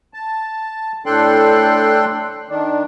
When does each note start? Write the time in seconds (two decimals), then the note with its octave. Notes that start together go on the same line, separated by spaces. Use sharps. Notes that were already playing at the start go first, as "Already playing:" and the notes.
0.14 A5
1.06 A2 D4 A4 G5 C6 F#6
2.49 D#3 D4